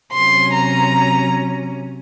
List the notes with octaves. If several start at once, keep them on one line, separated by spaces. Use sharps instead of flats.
C3 F#3 C#4 C6
A#5